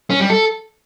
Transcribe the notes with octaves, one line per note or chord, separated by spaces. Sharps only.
C#4
G3
A4